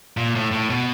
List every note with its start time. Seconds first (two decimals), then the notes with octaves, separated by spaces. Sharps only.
0.17 A#2
0.35 A2
0.52 A2
0.70 B2